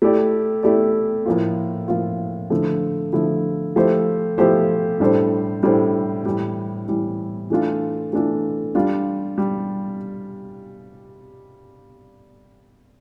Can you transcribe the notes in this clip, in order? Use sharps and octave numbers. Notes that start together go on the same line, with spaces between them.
A3 E4 G4 D5
A3 E4 G4 D5
A2 F3 A#3 F4
A2 F3 A#3 F4
D3 F3 A3 E4
D3 F3 A3 E4
F3 A3 E4 G4 C5
F3 A3 E4 G4 C5
A2 G3 D4 A4 C5
A2 G3 D4 A4 C5
A2 E3 G3
A2 E3 G3
E3 A3 D4 F4
E3 A3 D4 F4
G3 D4 F4
G3